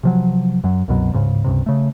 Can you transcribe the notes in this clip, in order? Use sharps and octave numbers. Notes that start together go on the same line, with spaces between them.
C3 F3 F#3
F#2 F#3
C2 F#2 B2 F#3
D1 D2 G#2 C#3
C#2 G2 C3
C#3 A3